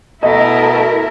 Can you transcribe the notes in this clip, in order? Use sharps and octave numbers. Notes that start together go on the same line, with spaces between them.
B2 A3 E4 A#4 D#5